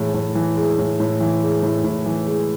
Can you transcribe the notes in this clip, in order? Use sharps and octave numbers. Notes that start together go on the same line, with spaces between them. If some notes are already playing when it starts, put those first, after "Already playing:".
Already playing: A2 E3 G#3
A2
E3
G#3
A2
A2
E3
G#3
A2
A2
E3
G#3